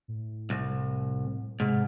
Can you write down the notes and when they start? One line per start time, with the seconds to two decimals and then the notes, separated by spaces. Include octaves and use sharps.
0.08 A2
0.50 C2
1.60 G#2 C3